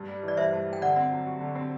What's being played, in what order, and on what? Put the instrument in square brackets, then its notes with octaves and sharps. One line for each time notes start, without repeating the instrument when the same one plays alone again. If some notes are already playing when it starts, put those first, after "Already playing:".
Already playing: [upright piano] G2
G3
[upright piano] E3 [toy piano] D5
[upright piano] G2 [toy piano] C5 E5
[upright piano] G2
G3
[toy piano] G5
[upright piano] D3 [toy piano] D5 F#5
[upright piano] C4
F#3
F#4
D3
C4